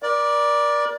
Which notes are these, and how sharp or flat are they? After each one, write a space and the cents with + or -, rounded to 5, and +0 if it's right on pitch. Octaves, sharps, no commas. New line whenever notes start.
A#4 +35 D5 +0